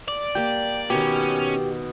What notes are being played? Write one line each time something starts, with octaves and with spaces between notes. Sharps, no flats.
D5
A#3 G4 G5
B2 D#3 C#4 G4